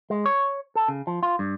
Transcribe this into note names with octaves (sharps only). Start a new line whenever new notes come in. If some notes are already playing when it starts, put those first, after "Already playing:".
G#3
C#5
A4
C#3
F3
F4
G2